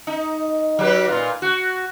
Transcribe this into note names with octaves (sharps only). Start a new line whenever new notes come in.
D#4
F#3 G4 B4
A#2 F4
F#4